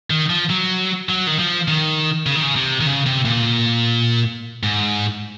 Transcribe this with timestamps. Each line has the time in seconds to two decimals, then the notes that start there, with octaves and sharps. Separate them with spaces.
0.10 D#3
0.30 F3
0.50 F#3
1.09 F#3
1.27 D#3
1.39 F3
1.68 D#3
2.26 C#3
2.35 D#3
2.43 C#3
2.56 C3
2.81 D#3
2.86 C#3
3.06 C3
3.25 A#2
4.63 G#2